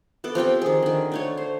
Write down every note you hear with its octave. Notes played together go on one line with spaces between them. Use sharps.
B3 A4 D6
F3 C4 G4 G5
D#3 G#4
D3 D#3
D3 A3 C#5
C5